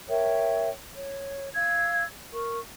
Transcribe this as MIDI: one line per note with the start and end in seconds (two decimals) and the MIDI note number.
0.09 0.69 70
0.09 0.69 73
0.09 0.69 76
0.09 0.69 79
0.95 1.48 73
1.54 2.03 77
1.54 2.03 88
1.54 2.03 92
2.31 2.58 70
2.31 2.58 85